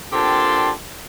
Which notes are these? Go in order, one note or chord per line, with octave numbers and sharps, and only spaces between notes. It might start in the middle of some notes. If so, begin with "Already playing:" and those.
A#2 D3 C4 G4 A5 C6